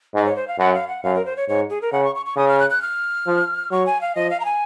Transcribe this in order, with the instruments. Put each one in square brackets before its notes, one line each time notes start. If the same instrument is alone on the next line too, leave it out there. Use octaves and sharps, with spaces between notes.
[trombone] G#2 [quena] D#5
[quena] C#5
C5
F5
[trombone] F#2 [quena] F#5
[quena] F5
F#5
[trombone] F#2 [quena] F5
[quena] A#4
C5
C#5
[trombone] G#2 [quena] C#5
[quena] G#4
A#4
[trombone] C#3 [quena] F#5
[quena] C#6
C#6
C#6
[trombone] C#3 [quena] D#6
[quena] F6
F#6
F#6
F6
[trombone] F3
[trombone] F#3 [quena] C#6
[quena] G#5
F5
[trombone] F3 [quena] D#5
[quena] F5
A#5
G#5